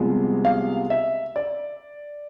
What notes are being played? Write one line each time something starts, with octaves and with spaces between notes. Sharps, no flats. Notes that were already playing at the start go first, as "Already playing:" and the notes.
Already playing: C2 C3 F3 G#3 B3
F5
E5
D5